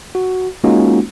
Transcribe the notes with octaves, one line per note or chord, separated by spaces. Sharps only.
F#4
G#3 A#3 C#4 D#4 F4 F#4